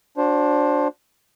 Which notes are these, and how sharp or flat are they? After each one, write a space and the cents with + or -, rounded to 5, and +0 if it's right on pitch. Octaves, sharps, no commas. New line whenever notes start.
D4 -5 F#4 -25 C5 +15